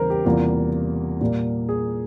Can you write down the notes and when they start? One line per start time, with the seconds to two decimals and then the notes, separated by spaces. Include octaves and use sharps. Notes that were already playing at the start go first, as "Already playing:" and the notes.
Already playing: E2 C#3 E3 G3 A#3 A#4 C5
0.10 G4
0.25 E2 C3 G3 A#3 F4
1.21 A#2 G3 A#3
1.69 G#4